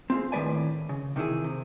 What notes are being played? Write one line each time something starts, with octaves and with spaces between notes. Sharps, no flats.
C4 F4 G#4
A2 D#3 A3 B4 D5 G#5
C#3
C3 D#3 E3 E4 G#4
C3